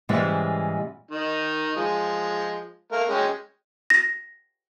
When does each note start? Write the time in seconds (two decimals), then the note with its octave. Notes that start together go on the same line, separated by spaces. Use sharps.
0.09 G#2 C#3 E3 G3 G#3
1.11 D#3 D#4
1.77 F3 G#3
2.92 A3 A#4 F5
3.08 G#3 C#4 G5
3.90 A#6